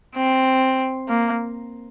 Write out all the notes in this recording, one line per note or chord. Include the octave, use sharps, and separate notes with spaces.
C4
A#3